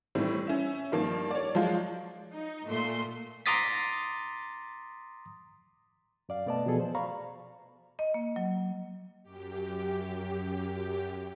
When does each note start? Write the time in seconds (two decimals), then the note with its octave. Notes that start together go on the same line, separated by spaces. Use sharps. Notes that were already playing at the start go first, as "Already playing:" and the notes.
0.15 A2 D#3 E3 G3 C4
0.47 C#4 E5
0.92 G2 D#3 F3 A#3
1.31 C#5 D5
1.55 F3 F#3 G#3 F4
2.32 D#4
2.67 A#2 A3 C6
3.46 A#5 C6 D6 D#6 A6 B6
6.29 F#2 D5 F5
6.46 B2 A3 B3 D5 D#5 A5
6.67 B2 E3 F3 G#4 A4
6.80 C5
6.95 D5 F5 A#5 B5 C#6
7.99 D#5
8.14 A#3
8.36 F#3
9.23 F#2 G4